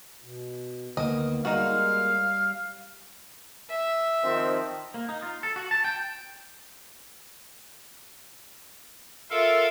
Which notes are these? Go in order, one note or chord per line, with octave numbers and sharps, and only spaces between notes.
B2
D2 D#3 A#3 B3 D#5
G3 G#3 A#3 D#4 F#4 F5
E5
D#3 F3 C4
A#3
D#4
F4
A4
F#4
A5
G5
F4 A4 A#4 E5 F5